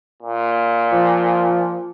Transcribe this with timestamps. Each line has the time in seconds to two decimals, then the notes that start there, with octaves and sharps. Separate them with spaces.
0.23 A#2
0.92 F3